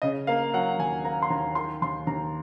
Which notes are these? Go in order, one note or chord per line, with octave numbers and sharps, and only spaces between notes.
C#3 D#5
A#3 F5
F#3 F#5
D#2 G#5
A#3 A#5
C6
D#2 A#5
D#3 C6
D#2 C6
D#2 A#5